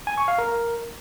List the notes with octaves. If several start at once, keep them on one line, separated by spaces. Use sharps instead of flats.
G#5
C#6
F5
A#4